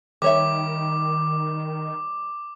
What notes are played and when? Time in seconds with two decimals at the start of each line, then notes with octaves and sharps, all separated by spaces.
0.22 D#3 G3 C#5 E5 D6